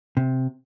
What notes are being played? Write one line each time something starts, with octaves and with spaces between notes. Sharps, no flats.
C3